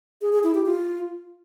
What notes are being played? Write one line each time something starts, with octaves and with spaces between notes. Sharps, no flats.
G#4
G#4
E4
G4
F4